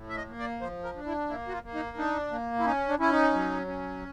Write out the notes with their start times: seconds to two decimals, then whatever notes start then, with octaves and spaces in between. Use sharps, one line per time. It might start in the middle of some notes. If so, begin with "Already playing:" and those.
Already playing: A2
0.09 E5
0.16 D#5
0.27 A#3
0.39 D5
0.61 F3 C5
0.84 A#4
0.95 D4
1.06 E4
1.29 A#3 E4
1.48 F#4
1.52 F4
1.64 A#3
1.74 D#4
1.97 D4 D#4
2.31 A#3
2.59 E4
2.65 C#4 D#4
2.89 D4
2.99 C#4 E4
3.11 D#4
3.33 F#3
3.67 C#4